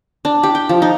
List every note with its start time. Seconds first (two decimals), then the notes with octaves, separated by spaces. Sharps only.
0.25 D4
0.43 G4
0.55 G5
0.69 F3
0.82 D#4